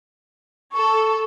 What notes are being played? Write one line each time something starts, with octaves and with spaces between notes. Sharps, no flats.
A4 C#6